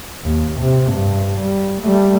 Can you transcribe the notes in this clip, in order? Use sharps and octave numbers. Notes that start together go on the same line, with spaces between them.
D#2
C3
G2
G3
G3 A3